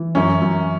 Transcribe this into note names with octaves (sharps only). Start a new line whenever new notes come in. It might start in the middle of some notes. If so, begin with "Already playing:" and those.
Already playing: E3
F#2 C#4
F#2